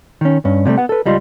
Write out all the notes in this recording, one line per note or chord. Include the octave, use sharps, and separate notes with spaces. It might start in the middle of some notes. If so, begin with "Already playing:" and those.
D#3 C#4
G2 C#4
C3 F#3 G3 A3
B3 F#5
A4 B4
C#2 G3 F4 D#5 C6